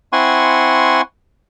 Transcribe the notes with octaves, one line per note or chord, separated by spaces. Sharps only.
C4 E4 F#5 G#5 C6 C#6